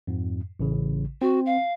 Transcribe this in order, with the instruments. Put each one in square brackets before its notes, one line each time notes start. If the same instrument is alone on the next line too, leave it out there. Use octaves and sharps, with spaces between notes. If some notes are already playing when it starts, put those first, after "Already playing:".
[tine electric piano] F2 G#2
A1 C#3
[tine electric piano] C4 [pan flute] F#4
[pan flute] F5